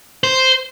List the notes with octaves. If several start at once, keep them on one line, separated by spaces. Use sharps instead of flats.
C5